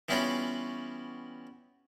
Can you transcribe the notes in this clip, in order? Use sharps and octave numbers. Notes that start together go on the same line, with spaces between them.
E3 G3 B3 C#4 F4 F#4